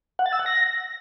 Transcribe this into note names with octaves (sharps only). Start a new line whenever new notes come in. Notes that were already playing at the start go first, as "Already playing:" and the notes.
F#5
A6
E6
F#5
A#6